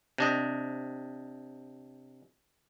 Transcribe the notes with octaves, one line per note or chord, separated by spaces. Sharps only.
C3 D4 D#5